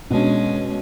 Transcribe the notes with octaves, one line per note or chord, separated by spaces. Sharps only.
B2 G#3 C#4 D4